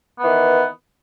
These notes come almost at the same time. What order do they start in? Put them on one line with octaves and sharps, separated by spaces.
B3 E3 D#3